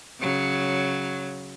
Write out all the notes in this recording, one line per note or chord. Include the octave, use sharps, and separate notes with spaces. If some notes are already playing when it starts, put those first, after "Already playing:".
C#3 F#3